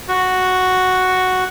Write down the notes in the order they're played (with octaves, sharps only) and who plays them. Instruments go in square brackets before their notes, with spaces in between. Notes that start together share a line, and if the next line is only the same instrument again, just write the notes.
[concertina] F#4